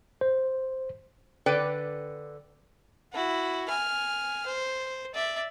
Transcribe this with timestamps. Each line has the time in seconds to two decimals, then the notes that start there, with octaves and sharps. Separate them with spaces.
0.21 C5
1.46 D3 B4 D5 G5
3.13 E4 F#4
3.69 G#5 F6
4.46 C5
5.15 D5 E5